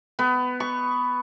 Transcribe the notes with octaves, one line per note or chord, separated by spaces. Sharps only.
B3
C#6